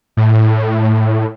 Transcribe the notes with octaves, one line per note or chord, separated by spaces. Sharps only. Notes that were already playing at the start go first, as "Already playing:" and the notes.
A2